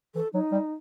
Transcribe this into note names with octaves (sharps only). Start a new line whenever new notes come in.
E3 A4
F#3 D#4
G3